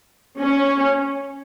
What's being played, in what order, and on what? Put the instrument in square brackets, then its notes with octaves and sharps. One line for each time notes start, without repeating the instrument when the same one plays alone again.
[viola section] C#4